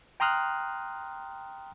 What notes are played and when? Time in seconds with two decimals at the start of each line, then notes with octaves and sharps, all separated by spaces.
0.20 G5 A#5 C6 D#6 F6 F#6